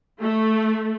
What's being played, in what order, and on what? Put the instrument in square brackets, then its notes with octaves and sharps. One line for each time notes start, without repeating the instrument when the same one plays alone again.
[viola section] A3